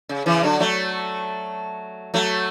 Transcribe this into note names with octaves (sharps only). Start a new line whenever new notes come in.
C#3
C#3 E3
D3 F#3
F#3 A3
F#3 A3